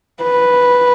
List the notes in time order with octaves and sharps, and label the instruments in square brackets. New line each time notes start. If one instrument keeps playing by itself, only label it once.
[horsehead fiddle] B4